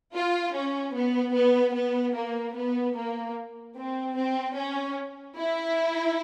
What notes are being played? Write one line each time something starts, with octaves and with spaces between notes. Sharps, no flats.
F4
C#4
B3
B3
B3
A#3
B3
A#3
C4
C4
C#4
E4